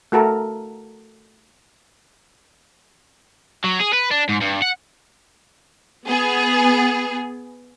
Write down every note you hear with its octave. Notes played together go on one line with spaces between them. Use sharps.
A3 F#4 A4 A#4
F#3
G#4
B4
D4
G#2
G2
F#5
B3 G#4